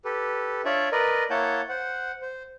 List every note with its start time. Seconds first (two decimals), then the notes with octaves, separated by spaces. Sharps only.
0.05 G4 A4 B4
0.65 D4 F4 C#5 D5 E5
0.92 A#4 B4 D5 D#5
1.30 A#3 E4 C#5 F#5 A5 G6
1.69 C5 F#5
2.22 C5